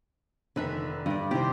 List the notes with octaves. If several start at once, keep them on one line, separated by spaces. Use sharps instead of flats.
F1 D3 D#3 B4 E5
G2 D3 D5 D#5
C3 D#3 E4 G4 C5